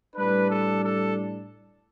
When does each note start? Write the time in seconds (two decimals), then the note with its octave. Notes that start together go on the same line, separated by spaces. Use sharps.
0.15 A2 G3 D4 B4
0.50 A4
0.84 A4